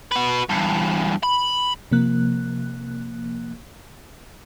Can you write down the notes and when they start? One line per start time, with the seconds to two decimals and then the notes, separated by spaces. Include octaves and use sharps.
0.12 F#4 B4
0.50 E2 G2
1.23 B5
1.91 C3 F3 A#3 F#6